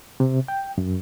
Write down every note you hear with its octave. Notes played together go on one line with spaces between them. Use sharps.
C3
G5
F#2